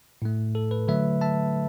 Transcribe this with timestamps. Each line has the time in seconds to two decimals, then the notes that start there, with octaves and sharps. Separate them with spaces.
0.22 A2 A3
0.55 A4
0.71 B4
0.88 D3 F#3 A3 B4 E5
1.21 E5 A5